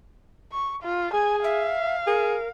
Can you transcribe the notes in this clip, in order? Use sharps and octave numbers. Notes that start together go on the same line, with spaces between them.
C#6
F4
G#4 G#5
E5 F5
G#4 A#4